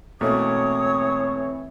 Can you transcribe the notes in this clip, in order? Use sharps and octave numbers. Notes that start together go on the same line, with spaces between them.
B2 E3 A3 A#3 C4 C#5 D#6